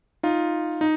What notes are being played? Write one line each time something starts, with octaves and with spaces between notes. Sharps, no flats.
D#4 F4
D#4